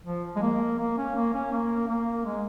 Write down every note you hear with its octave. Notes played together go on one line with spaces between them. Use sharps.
F3
G#3
A#3
A#3
C#4
A#3
C#4
A#3
A#3
G#3